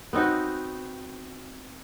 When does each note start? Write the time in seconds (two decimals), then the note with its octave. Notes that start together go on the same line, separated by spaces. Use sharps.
0.13 B3 C4 D#4 F#4